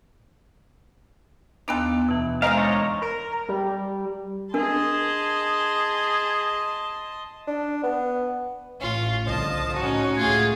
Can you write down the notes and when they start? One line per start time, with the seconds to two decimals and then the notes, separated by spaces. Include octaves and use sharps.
1.68 D#2 B3 D4 D#4 F4 A4
2.06 F2 B2 E3
2.42 G#3 C4 A#4 C5 D#5 F5
2.57 D4 D#4 C#5
3.02 A#4
3.49 G3
4.54 D4 G#4 A#4 D#5 A5 C6
7.47 D4
7.83 B3
8.81 A1 C#4 F4
9.26 C2 D3 F3 D#5 A5
9.76 A2 C#4 D#4 F#4
10.17 C#2 A2 A3 F4 G#4 G#6